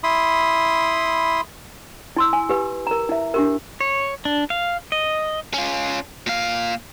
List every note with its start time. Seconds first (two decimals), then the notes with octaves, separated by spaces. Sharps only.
0.04 E4 B5 C6 D#6
2.16 E4 C6 E6
2.33 G#5
2.49 G4 B4
2.87 A#4 A#5
3.09 E4 E5
3.34 D4 G4 A#4
3.81 C#5
4.25 D4
4.50 F5
4.92 D#5
5.54 C#4 F4
6.27 A#2 F5